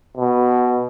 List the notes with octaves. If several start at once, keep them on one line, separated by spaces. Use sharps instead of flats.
B2